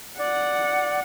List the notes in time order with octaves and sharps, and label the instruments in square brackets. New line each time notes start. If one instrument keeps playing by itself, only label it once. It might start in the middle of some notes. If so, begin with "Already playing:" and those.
[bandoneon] D5 [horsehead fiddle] F#5